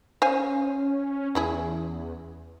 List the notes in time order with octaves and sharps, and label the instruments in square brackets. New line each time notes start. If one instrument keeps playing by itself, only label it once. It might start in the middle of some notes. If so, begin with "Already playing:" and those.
[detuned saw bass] C#4 [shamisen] C5 F5 G#5
[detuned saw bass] E2 [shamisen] C#3 E4 G#4